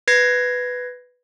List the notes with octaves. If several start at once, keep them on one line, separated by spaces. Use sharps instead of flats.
B4 G#6 A#6 C7